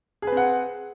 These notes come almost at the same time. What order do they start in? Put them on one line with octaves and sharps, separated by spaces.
G#4 B4 C4 F#5